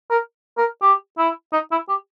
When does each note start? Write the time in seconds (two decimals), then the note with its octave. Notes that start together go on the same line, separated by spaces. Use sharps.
0.10 A#4
0.58 A#4
0.82 G4
1.18 E4
1.53 D#4
1.71 E4
1.89 G4